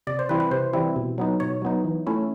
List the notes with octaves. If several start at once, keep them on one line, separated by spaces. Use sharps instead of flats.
C3 D5
C5
E3 G3 C4 E4 B4
B4
C3 C5
E3 G3 C4 E4
B2
F#3 B3 D#4
B2 C#5
F#3 B3 D#4
E3
A3 C#4 E4